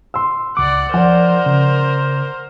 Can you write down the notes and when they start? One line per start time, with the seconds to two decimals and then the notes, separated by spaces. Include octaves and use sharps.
0.14 C6 E6
0.57 C#2 D5 F#5 D6
0.94 F3 A#4 C5 D5 F#5
1.46 C#3